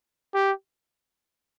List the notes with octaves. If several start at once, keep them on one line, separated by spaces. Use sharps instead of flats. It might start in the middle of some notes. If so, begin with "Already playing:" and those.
G4